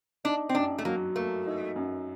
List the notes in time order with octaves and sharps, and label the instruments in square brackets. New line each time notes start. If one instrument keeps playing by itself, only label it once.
[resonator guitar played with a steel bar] D4 [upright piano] D#4
[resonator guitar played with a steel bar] C4
[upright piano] F#2 [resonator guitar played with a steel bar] D4
[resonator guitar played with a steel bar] A3
[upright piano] F#3 [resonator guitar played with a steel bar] A#3
[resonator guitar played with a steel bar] A3 [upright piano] A#3
[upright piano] D#4
F#2